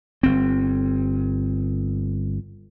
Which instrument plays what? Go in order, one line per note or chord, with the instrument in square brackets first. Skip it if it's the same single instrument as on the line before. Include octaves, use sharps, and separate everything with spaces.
[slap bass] G1 C4